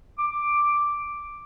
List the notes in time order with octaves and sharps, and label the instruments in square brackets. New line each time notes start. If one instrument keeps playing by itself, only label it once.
[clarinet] D6